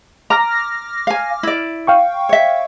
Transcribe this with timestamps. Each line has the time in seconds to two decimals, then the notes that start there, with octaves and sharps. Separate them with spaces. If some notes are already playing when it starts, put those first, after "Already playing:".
0.30 A#5 D6 F6 A#6
1.07 F5 G#5
1.43 E4 D5
1.87 F5 G5 C#6
2.29 C#5 E5